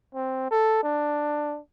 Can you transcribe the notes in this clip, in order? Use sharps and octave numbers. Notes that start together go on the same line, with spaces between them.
C4
A4
D4